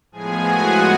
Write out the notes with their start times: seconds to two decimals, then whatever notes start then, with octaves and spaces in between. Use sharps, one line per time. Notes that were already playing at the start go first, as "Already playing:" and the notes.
0.12 A2 F3 G#3 B3 G#4 G#5
0.43 F#4 F#5